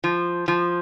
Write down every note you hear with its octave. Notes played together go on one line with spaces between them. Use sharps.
F3
F3